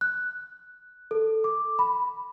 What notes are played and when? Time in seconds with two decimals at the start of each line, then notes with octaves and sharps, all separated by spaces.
0.01 F#6
1.11 A4
1.44 D6
1.79 B5